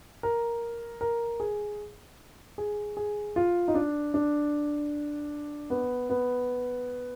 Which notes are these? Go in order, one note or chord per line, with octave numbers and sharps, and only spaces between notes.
A#4
A#4
G#4
G#4
G#4
F4
D#4
D4
D4
B3
B3